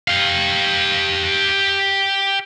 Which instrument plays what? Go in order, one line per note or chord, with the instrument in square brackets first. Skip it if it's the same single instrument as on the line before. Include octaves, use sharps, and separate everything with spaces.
[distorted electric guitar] G4 F5